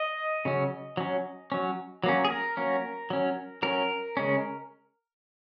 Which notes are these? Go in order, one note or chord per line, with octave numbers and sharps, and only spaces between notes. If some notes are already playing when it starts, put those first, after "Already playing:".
Already playing: D#5
C#3 F#3 C#4
F#3 C#4
F#3 C#4
F#3 A#3 C#4
G#4
A#4
F#3 A#3 C#4
F#3 C#4
F#3 C#4 A#4
C#3 G#3 C#4